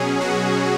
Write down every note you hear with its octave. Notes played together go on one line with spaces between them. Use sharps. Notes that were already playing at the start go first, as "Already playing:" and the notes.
Already playing: B2 F#3 C#4 G#4
F#4